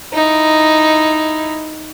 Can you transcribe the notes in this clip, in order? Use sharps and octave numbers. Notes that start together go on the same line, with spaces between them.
D#4 E4